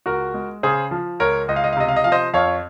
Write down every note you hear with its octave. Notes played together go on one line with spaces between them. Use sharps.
C#2 F#4 A#4
G#3
C#3 G#4 C5
F3
C#2 A#4 C#5
C#2 D#5
F5
D#5
F5
C3 D#5
F5
D#5
F3 F5
C5 D#5
F2 C#5 F5